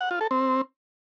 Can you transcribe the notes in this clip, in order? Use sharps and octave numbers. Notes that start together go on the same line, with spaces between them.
F#5
F4
A4
C4